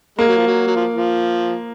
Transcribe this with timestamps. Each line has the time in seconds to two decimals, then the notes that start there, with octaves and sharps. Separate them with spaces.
0.18 G#3 A#3
0.28 F#3
0.38 F3
0.47 F#3
0.67 F#3
0.76 F3
0.93 F3